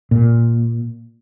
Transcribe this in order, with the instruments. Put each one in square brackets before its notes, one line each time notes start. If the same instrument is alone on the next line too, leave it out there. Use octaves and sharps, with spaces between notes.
[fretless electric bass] A#2